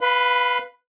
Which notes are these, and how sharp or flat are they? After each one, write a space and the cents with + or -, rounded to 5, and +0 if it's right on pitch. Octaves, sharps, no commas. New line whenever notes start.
B4 +0 F5 +10 B5 +35